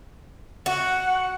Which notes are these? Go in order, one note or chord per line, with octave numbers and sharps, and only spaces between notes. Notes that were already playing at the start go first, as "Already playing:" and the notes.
F#4 F#5